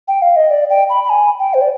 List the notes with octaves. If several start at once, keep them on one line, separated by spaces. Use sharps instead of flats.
G5
F5
D#5
D5
G5
B5
B5
G#5
G5
C5
D5